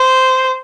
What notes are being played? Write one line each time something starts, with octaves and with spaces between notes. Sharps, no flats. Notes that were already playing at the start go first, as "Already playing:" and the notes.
Already playing: C5